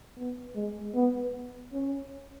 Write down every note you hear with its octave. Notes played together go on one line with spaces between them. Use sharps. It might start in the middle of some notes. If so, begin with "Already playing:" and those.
B3
G#3
B3
C#4